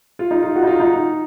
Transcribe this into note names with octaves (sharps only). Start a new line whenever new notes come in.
F4
D#4
F4
F#4
D#4
F4
D#4